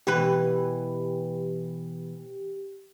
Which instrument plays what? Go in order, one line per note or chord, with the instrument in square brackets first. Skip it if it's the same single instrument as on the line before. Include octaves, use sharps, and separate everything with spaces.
[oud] B2 E3 B4 [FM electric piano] G4